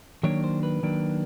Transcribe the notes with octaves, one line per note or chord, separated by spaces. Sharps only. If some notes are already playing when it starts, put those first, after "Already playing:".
D#3 F#3 A#3 D4 C#5
C5
B4
D#3 F#3 A#3 D4